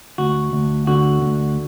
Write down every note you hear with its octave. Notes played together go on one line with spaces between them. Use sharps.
D2 F#4
D2
D3 F#4
D2